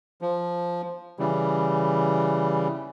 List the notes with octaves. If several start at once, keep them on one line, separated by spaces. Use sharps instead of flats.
F3
C#3 E3 G3